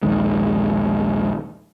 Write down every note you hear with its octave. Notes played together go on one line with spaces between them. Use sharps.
A#1 D#2 D#3 G#3